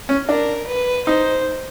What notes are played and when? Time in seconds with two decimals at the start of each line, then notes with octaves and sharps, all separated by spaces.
0.09 C#4
0.29 D4 A#4
0.68 B4
1.07 D#4 C5